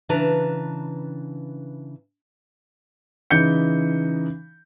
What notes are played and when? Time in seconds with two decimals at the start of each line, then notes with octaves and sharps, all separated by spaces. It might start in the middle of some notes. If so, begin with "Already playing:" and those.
0.09 C#3 E3 D4 B4 A5 A#5
3.31 C#3 E3 D#4 G6 C#7